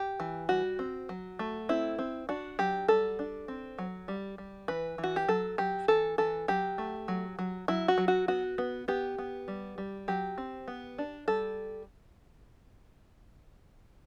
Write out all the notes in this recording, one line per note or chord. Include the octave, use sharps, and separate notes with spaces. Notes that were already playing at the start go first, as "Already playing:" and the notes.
Already playing: G4
E3
G3 F#4
C4
F#3
A3
C4 E4
C4
D4 F#4
F#3 G4
G3 A4
D4
C4
F#3
G3
G3
E3 B4
E3
F#4
G4
F#3 A4
F#3 G4
E3 A4
E3 A4
F#3 G4
A3
F#3
F#3
F#3 E4
F#4
F#3
F#4
B3 F#4
B3
B3 G4
B3
G3
G3
F#3 G4
C4
B3
D4
G3 A4